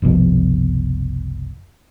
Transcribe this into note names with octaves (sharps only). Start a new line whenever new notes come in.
F#1 C2 B2 F3